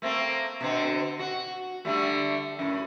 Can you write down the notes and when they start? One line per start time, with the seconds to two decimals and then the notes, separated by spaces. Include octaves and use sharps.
0.02 A3 A#3 C4
0.61 B2 D3 C4
1.19 F#4
1.85 D3 G3 A3
2.59 F#2 A2